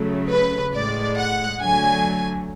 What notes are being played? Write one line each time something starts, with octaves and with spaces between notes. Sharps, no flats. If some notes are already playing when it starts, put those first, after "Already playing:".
Already playing: C#3 F#3 A3
B4
A2 G#3 D5
F#5
D3 F#3 A3 G#5